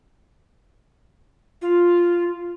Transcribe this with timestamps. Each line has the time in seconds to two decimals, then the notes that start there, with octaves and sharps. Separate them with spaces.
1.62 F4